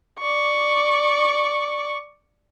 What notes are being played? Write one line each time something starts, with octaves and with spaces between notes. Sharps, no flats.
D5 C#6